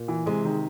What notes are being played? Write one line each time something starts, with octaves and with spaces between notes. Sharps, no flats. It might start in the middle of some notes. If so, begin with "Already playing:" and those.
Already playing: A#2
E3
C3 G#3
D#3